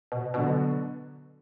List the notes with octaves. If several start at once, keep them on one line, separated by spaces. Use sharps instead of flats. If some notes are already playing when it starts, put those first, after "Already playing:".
B2
B2 D3 F#3 B3 D4 F#4